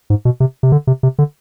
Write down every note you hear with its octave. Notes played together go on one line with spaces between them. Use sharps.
G#2
B2
C3
C3
D3
C3
C3
D3